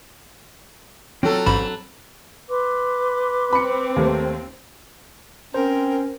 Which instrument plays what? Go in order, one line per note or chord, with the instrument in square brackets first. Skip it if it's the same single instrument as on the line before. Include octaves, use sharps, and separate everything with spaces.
[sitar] F#3 A4 [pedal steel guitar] C4 F4 G5
[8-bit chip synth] A1 G#2 B5 [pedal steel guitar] C4 A5
[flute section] B4 C6 D6
[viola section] C4 [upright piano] B5 C#7
[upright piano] D#2 A3 A#3
[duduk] C4 [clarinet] C#4 [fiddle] A#4 [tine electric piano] C5